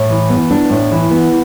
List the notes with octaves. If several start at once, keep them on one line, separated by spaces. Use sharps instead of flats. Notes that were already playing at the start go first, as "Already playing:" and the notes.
Already playing: A2
E3
B3
D4
A2
E3
B3